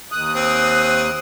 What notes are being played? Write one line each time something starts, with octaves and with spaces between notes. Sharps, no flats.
D#2 D#6 F#6
C4